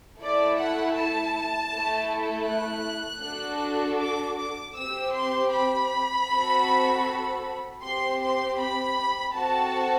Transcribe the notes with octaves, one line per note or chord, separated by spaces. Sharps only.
A3 E4 A4 D5
F#5
A5
A3 E4 A4
F#6
D4 F#4 A4
D6
D6
C4 G4 E6
C6
B5
C4 F#4 A4
C4 G4 C6
C6
B5
C4 F#4 A4 A5